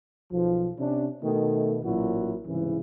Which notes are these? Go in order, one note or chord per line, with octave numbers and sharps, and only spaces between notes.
B1 F3
C3 C#4 D4
B2 D#3 A3
A1 A#2 F#3 E4 F#4
C2 G#2 C#3 E3